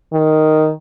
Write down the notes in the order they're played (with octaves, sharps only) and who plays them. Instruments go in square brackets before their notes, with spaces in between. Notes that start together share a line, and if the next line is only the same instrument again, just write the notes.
[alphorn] D#3